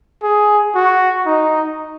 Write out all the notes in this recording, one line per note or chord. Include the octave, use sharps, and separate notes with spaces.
G#4
F#4
D#4